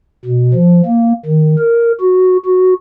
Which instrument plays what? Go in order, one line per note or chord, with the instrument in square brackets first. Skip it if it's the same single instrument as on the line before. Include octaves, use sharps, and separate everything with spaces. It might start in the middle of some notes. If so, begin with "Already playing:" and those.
[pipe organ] B2
F3
A#3
D#3
A#4
F#4
F#4